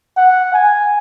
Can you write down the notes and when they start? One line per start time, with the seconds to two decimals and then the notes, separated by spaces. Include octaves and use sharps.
0.17 F#5
0.54 G#5